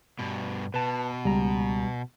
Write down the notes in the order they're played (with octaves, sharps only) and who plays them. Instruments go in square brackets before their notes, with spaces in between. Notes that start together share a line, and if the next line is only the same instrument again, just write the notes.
[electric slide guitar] G2 B2
[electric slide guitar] B2 [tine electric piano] B4 A5
[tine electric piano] C#2 A#5 [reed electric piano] G3